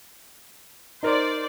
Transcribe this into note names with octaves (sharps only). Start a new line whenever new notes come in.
D#4 A#4 C5 D5